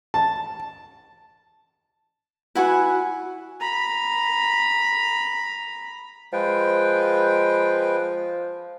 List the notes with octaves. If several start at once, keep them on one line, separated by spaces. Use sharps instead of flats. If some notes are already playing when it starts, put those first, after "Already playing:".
A5
E4 F#4 B4 F#5 G#5
A#5 B5
F3 G#3 B4 G5